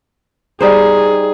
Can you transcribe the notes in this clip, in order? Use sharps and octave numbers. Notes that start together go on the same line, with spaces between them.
G3 D#4 G#4 C5